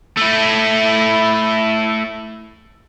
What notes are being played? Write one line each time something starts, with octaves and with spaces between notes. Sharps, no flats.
A3 E4